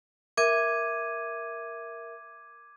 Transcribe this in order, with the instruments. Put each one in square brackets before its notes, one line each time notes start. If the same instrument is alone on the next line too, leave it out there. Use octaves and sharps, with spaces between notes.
[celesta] A#4 E5 [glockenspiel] D6 G#6 D#7